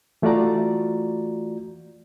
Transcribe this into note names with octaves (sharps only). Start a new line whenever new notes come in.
E3 A3 F4 F#4 D5 A#5